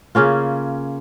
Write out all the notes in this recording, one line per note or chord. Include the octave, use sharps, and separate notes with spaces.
C#3 A#3 C#4 F4